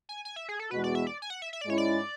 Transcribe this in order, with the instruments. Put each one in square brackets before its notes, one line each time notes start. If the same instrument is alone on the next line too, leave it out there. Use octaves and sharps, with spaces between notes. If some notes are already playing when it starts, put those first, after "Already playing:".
[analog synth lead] G#5
G#5
E5
G#4
A4
[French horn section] E2 B2 G#3 B3 F#4 [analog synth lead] B4
[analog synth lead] D5
E5
D5
G#5
F#5
E5
E5
D5
[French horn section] G#2 G#3 C#4 E4 [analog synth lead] C#5
[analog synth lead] D5